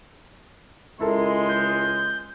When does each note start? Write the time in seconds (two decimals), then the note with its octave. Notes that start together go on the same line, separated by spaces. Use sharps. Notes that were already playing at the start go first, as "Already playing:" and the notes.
1.00 C#2 G#3 E4 A4 A#4 C6
1.49 G6